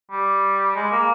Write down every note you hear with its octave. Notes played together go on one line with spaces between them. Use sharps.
G3
G#3
A#3